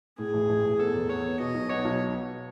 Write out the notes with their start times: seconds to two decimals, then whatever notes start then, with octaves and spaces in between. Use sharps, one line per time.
0.18 A2 G#4
0.33 A1
0.49 A1
0.65 A1
0.79 B3 A4
0.94 E2
1.09 B3 C#5
1.24 B3
1.40 B2 D#5
1.54 B1
1.69 B3 C#5
1.85 B1